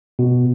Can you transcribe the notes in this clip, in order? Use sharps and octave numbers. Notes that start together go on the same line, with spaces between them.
B2